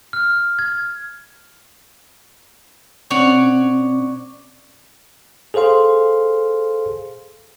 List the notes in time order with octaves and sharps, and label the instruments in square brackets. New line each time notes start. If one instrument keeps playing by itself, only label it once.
[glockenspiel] F6
G#6
[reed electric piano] B2 C4 C#4 [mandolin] C#5 D5 F#5
[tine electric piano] G#4 A4 C5 F5 C6